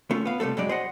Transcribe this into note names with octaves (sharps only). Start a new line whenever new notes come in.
A3 C#4 F4
B3 F5
C3 G3 A3 A4
G2 F#3 G#3 D5
C5 D#5 F#5